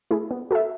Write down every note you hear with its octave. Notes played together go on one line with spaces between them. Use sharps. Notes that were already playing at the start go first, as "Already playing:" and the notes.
A3 E4 G#4
B3
F#4 A4 E5